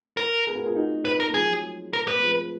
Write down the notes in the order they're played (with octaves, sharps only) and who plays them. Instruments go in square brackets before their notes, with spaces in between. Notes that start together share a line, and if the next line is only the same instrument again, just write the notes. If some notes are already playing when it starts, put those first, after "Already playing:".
[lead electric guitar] A#4
[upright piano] G#4 B4
F#4 A#4
F4 G#4
D#4 F#4
[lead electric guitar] B4
A#4
[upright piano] A#3
[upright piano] F3 G#3 [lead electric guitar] G#4
[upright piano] F#3
[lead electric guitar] A#4
B4
[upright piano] A#3
F3 G#3